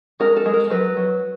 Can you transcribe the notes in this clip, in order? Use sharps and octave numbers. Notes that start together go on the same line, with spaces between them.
G#3 A#4
A4
G#3
A#4
F#3 B4
F#3